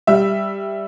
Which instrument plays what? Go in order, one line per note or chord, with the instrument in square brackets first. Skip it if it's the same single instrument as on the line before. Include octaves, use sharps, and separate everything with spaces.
[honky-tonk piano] G3 E5